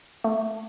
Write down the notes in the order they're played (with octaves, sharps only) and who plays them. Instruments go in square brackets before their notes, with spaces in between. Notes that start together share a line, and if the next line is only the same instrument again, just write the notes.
[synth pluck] A3